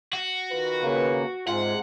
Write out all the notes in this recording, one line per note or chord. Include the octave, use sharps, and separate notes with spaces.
F#4
D#3 F4 B4
C#3 A#3
G#2 C3 G#3 F4 F#5